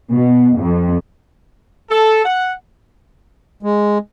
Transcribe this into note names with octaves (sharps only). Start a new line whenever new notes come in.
B2
F2
A4
F#5
G#3